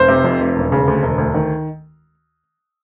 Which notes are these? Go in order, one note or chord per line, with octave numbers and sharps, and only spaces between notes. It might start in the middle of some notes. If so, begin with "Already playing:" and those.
Already playing: F1 C5
C3
F2
F1
E1
C#3
D2
E1
D2
D#3